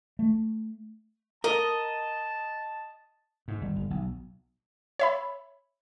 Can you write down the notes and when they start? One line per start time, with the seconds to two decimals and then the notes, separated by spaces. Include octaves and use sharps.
0.19 A3
1.44 A#4 D#5 A5
3.48 G#2
3.61 G1
3.76 G1
3.90 B1
4.99 C#5 E5 B5